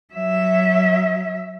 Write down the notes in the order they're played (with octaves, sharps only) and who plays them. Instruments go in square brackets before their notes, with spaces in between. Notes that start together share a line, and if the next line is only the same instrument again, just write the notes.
[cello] F#3 E5